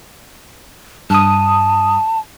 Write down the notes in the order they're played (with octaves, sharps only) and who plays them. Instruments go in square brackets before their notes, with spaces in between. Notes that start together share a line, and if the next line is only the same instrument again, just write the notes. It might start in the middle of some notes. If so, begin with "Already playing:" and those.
[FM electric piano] G2 D#6 [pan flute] A5